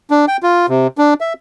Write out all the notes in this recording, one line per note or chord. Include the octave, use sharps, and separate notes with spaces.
D4
G5
F4
C3
D4
E5